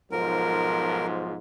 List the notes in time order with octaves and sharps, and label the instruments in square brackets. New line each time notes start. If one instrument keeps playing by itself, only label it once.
[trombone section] B1 G#2 F3 [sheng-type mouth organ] A#4